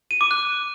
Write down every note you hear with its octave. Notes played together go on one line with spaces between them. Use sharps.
D#7
D6
F#6